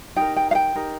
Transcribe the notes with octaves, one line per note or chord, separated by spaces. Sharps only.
D#4 G4 A#4 G5
G5
F5
G5
D#4 G4 A#4